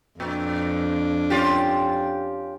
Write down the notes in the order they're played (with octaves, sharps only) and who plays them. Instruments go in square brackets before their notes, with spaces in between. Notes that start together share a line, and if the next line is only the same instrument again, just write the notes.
[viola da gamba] F2 D4 [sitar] A#2
[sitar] C#4 F4 G4